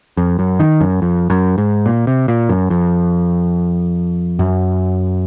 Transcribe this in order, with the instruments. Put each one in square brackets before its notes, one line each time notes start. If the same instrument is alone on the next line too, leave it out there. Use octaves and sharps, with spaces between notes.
[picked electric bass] F2
F#2
D#3
F#2
F2
F#2
G#2
A#2
C3
A#2
F#2
F2
F#2